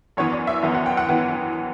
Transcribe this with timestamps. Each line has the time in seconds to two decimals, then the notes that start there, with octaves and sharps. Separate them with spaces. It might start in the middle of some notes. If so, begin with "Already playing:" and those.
0.17 F#2 E3 B3 C#5
0.32 D5
0.47 E5
0.62 F#2 E3 B3 E5
0.75 F#5
0.86 G5
0.97 F#5
1.09 E3 B3